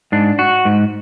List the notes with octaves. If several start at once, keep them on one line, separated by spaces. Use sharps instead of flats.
G#2 D4
F#4
G#2